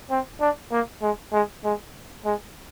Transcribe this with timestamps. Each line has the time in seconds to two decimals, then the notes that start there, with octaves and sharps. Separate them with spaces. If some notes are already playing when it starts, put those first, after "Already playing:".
0.10 C4
0.40 D4
0.71 A#3
1.02 G#3
1.33 G#3
1.64 G#3
2.25 G#3